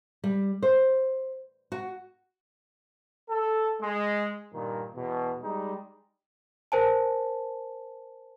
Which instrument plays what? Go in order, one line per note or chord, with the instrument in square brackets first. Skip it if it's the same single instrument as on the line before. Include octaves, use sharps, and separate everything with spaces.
[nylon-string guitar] G3
C5
F#4
[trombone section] A4
G#3
G2 A#2 D#3
E2 B2
G3 G#3 D#4
[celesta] A#4 C5 G#5 A5